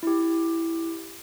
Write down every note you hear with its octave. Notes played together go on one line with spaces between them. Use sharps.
E4 G4